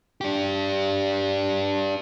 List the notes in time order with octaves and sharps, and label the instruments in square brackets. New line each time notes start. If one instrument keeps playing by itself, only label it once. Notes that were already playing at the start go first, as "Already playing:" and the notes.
[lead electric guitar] D4 G4